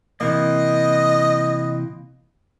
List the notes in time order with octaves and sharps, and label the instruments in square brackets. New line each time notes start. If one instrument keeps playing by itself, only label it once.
[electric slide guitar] C3 E3 A#3 [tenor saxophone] D#5